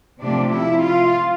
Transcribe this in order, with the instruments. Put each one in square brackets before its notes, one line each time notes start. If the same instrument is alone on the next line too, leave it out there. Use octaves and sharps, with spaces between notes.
[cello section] C3 F3 A3 D4
E4
F4